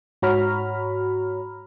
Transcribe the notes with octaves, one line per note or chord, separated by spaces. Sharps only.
G#2 F#4 C#5 A#5 B5 F6